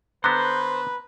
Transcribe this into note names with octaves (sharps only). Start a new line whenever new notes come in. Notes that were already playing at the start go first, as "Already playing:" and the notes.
D3 B3 B4 C5 A#5 F#6 A#6